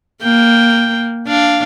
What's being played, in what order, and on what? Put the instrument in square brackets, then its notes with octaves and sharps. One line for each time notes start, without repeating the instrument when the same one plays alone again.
[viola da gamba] A#3 [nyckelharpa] G5
[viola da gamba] D4 [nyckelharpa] F5